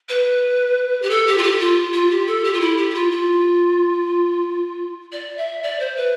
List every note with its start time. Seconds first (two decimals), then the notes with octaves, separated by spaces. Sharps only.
0.08 B4
1.02 G4
1.10 A4
1.27 G4
1.37 F4
1.42 G4
1.59 F4
1.93 F4
2.10 G4
2.27 A4
2.44 G4
2.53 F4
2.60 E4
2.77 G4
2.90 G4
2.94 F4
3.11 F4
5.12 D5
5.37 E5
5.63 D5
5.79 C5
5.96 B4